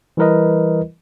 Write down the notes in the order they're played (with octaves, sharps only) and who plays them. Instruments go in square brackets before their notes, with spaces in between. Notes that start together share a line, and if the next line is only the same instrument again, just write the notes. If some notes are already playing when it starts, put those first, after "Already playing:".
[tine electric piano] E3 G3 E4 A#4 B4 D#5